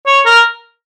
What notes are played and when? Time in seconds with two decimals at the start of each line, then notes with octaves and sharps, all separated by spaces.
0.07 C#5
0.26 A#4